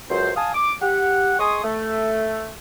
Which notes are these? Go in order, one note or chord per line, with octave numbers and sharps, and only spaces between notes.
C#2 F#2 C5
F5 G#5 A5 D#6
D6
G4 F#5
G#3 G#5 C6 C#6 D#6
A3